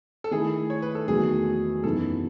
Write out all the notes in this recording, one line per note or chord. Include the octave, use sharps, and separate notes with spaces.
A4
D#3 A3 E4 G#4
C#5
B4
A4
E2 D#3 F#3 A3 D#4 G#4
F#2 E3 B3 D#4 A4